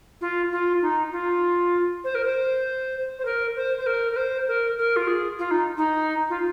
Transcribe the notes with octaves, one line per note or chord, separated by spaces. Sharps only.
F4
F4
D#4
F4
C5
A#4
C5
C5
A#4
C5
C5
A#4
A#4
C5
A#4
A#4
F4
G#4
F4
D#4
D#4
F4